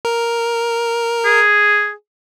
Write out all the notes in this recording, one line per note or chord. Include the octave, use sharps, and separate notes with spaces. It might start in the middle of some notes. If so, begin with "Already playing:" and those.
A#4
G#4